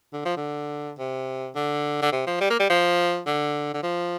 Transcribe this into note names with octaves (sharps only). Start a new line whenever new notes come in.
D3
F3
D3
C3
D3
D3
C3
F3
G3
A#3
G3
F3
D3
D3
F3